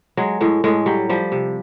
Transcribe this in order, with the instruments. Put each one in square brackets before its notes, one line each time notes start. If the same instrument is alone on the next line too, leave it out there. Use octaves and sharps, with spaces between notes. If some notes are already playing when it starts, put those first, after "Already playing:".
[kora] F#3 G#3
A2 G#3
A2 G#3
F#3 G3
F3 G3
C3